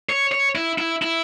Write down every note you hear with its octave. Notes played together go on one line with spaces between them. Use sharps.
C#5
C#5
E4
E4
E4